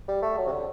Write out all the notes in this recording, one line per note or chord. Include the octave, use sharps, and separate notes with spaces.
G3
A3
F#3
C3
D3